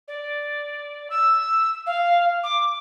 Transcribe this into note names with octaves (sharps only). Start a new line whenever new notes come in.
D5
E6
F5
D6